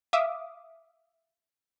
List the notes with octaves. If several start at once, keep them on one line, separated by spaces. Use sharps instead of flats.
E5 F5 D6 D#6